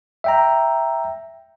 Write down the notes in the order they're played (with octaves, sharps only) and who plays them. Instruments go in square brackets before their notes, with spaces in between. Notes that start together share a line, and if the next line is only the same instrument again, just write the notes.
[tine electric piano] E5 G5 A#5